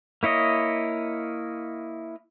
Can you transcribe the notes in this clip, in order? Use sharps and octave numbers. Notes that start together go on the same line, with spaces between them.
A#3 E4 C#5 D#5